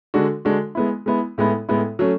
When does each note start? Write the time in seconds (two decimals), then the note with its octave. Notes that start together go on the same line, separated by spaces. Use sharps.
0.14 D3 G#3 D4 F#4
0.45 D3 G#3 D4 F#4
0.75 G#3 B3 E4
1.06 G#3 B3 E4
1.38 A2 G#3 B3 E4
1.69 A2 G#3 B3 E4
1.99 F#3 A3 C#4